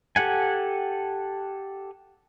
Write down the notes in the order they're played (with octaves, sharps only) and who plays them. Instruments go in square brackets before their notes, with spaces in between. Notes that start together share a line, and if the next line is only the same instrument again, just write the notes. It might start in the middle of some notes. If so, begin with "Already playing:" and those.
[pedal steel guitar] G4 A4 F#5 G#5